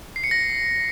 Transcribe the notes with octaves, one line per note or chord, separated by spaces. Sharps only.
C7
C#7
A#6